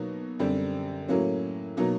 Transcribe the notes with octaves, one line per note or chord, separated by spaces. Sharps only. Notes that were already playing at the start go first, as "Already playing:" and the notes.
Already playing: B2 F#3 A#3 D#4
F#2 D3 G3 C4
A2 F#3 A#3 C#4
B2 F#3 A#3 D#4